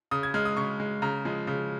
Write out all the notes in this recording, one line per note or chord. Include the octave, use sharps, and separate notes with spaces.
C#3 D#6
G#6
G#3 F6
D#6
C#3 C#6
G#3
C#3 A#5
F3 G#3
C#3